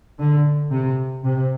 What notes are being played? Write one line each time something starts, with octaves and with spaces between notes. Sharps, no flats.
D3
C3
C3